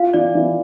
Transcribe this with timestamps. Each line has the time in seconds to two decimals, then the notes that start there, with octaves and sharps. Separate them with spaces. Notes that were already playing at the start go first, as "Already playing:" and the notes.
Already playing: F4 F5
0.14 E3 D5
0.35 E3